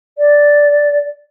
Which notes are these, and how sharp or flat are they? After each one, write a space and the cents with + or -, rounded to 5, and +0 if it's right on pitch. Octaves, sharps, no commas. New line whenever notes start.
D5 -5